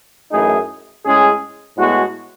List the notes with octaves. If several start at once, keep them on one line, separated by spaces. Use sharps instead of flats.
F#2 E3 A3 D#4 G#4
A2 G#3 C#4 G#4
A2 G#3 B3 F#4